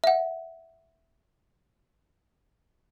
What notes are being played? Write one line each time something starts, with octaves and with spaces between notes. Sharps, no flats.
E5 F#5